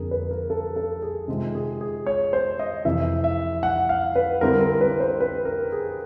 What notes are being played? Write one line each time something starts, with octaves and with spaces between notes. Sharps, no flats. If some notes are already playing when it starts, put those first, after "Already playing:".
Already playing: F2 D3 F3 A#3 G#4 A#4
B4
A#4
A4
A4
G#4
C3 D#3 G#3 C4 F4
G#4
G#4
C#5
C5
D#5
F2 C3 E3 E5
E5
F#5
F5
B4
D3 G3 C4 E4 A#4
A#4
B4
C5
B4
A#4
G#4